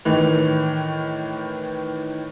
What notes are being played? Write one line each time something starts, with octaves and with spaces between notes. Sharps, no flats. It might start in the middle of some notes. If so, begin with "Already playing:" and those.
A2 D#3 E3